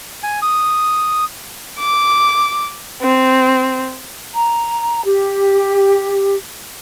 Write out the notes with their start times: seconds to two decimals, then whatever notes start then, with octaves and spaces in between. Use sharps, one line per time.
0.23 G#5
0.42 D#6
1.79 D6
3.02 C4
4.35 A#5
5.03 G4